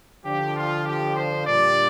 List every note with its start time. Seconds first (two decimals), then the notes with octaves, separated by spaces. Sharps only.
0.24 D3 F3 D4 G4
0.55 F4
0.85 G4
1.15 C5
1.45 A#2 G3 D4 D5